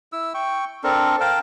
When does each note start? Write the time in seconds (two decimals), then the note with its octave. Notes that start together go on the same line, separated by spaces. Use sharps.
0.12 E4 E6
0.34 G5 C#6
0.83 C4 D4 A4 A#4
1.20 A#4 F5 G5 A5